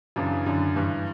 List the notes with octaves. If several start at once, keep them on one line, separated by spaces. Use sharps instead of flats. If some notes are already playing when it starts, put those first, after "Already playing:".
F#2 C#3 E3 D4
F#2 D3
G2 E3